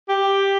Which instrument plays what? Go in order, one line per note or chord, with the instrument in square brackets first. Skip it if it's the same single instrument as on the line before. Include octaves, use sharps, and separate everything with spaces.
[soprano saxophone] G4